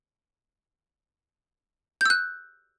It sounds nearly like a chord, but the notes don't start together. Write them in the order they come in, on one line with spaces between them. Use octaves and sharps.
G6 E6 F#6